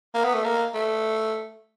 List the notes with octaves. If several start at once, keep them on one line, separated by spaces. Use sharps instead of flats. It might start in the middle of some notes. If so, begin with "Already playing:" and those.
A#3
B3
A3
A#3
A3